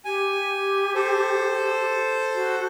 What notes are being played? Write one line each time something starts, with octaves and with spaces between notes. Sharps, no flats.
G4 G#5
A4 C5
F#4